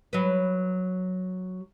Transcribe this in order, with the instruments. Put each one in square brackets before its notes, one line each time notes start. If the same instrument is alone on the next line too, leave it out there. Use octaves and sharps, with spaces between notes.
[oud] F#3 B4